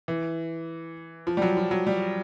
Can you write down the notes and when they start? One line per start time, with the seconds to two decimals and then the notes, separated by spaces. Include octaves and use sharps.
0.08 E3
1.27 F3
1.37 G3
1.42 F#3
1.57 F3
1.71 F#3
1.87 G3